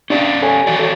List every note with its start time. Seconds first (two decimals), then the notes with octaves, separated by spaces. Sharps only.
0.10 C#4 D4 G4 D5
0.42 A4 C#5 G#5
0.67 E3 F#4 D5
0.79 A4 C#5